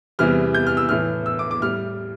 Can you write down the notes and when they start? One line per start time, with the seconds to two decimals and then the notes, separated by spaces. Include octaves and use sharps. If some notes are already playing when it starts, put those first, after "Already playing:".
0.19 E2 C3 E3 G3 F6
0.55 G6
0.67 F6
0.77 E6
0.89 A2 E3 A3 F6
1.26 E6
1.39 D6
1.51 D6
1.62 A2 G3 F6